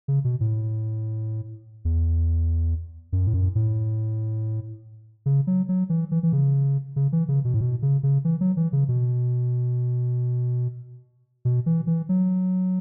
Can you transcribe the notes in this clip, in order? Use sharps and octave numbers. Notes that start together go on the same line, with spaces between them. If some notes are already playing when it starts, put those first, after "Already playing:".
C#3
B2
A2
E2
F#2
A2
F#2
A2
C#3
F#3
F#3
E3
E3
E3
C#3
C#3
E3
C#3
B2
A2
B2
C#3
C#3
E3
F#3
E3
C#3
B2
B2
E3
E3
F#3